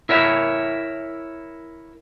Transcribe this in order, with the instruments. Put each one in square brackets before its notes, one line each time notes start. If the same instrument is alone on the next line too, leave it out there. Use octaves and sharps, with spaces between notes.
[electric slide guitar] E4 A#4 C#5 E5